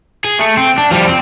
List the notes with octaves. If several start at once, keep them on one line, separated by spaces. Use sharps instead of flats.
G#4
A3
C4
D4
F3 G3
C4